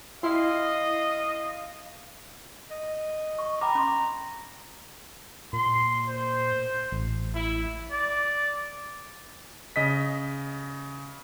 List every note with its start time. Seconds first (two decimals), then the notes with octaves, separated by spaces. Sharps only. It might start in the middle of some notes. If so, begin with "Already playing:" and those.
0.23 E4 D#5 F5 C6 C7
2.71 D#5
3.38 C#6
3.61 G5 A#5 B5 D6
3.75 C#4 C6
5.53 A#2 C6
6.08 C5
6.92 A1
7.35 E4
7.91 D5
9.76 C#3 D#5 B6